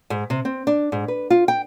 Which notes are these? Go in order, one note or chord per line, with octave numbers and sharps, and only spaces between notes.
G#2
C3
C4
D4
G#2
B4
F4
G5